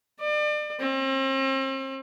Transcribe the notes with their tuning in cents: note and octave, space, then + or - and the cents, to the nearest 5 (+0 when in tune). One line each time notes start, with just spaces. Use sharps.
D5 +35
C4 +40